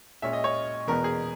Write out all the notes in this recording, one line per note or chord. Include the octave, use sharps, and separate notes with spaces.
A#2 G#3 C#4 E5
D#5
C#5
E2 B2 G#3 B3 A#4
G#4